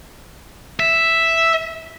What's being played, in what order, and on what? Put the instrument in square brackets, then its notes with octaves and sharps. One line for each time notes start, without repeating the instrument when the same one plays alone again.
[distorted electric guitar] E5